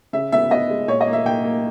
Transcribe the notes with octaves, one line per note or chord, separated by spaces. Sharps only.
C#3 E5
B3 E5
B3 D#5
G#3
A#2 C#5
D#5
A#3
E5
A#3 G5
A#3